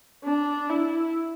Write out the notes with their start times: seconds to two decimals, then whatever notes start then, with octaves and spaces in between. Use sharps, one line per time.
0.25 D4
0.70 E4